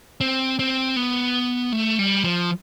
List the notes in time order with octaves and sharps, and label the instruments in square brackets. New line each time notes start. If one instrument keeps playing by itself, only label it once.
[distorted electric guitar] C4
C4
B3
A3
G3
F3